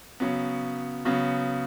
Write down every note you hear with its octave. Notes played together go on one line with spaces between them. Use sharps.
C#3 F#3 B3
C#3 F#3 B3